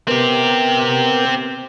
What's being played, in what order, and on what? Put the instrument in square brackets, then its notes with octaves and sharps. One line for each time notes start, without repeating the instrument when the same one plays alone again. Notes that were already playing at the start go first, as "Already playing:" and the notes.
[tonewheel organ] B3 A#4 [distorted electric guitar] C4 G4